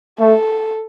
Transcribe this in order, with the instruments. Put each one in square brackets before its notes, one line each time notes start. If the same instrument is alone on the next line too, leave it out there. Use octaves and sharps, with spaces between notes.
[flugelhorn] A3 [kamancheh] A4